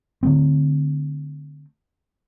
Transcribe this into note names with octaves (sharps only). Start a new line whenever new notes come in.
D3 A3 C4